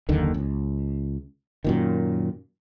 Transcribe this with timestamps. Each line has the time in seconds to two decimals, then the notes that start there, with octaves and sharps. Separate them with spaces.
0.09 F#1 D#2 D3 D#3
0.34 C#2
1.64 F#2 A#2 D#3